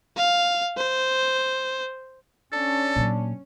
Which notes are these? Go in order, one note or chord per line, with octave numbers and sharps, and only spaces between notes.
F5
C5
C#4 D4 A4
A#2 F#3